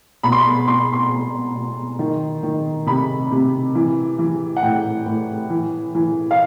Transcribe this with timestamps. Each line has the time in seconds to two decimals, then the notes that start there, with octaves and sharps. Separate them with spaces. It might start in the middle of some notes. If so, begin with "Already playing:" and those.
0.23 B2 B5
0.32 C6
0.41 B5
0.68 B2 C6
0.93 C6
1.12 B2
1.56 B2
1.99 D#3
2.43 D#3
2.86 C3 B5
3.31 C3
3.75 E3
4.19 E3
4.57 F#5
4.62 A2 G5
5.06 A2
5.50 E3
5.95 E3
6.31 F5